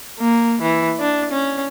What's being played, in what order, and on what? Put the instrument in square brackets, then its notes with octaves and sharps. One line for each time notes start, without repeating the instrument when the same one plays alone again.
[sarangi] A#3
E3
D4
C#4